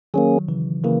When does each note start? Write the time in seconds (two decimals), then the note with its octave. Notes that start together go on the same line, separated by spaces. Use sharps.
0.14 D#3 F#3 A#3 C#4 G#4
0.49 C#3 E3
0.84 C#3 E3 A#3